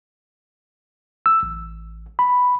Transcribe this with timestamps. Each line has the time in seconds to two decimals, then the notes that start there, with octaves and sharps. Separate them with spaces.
1.26 E6
1.43 A1
2.19 B5